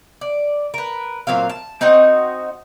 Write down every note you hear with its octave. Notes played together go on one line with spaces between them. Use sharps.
D5
A#4 B4
A#2 F#3 C4 F5
A5
C4 D#4 F#4 D#5